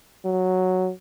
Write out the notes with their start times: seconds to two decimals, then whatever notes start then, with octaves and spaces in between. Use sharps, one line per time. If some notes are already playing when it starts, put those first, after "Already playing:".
0.25 F#3